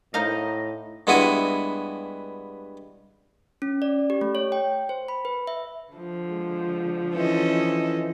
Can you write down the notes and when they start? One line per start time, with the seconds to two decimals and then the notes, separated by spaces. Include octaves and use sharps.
0.14 A2 D#4 C5 D#5 F5
1.07 G2 G#3 B3 E4 F#4 G#5
3.62 C#4
3.82 D5
4.10 G4
4.21 A3
4.35 C#5
4.52 G5
4.89 C5
5.08 B5
5.25 B4
5.47 E5
5.92 D3 F3
6.29 G#3
7.14 E3 C#4 A4 D#5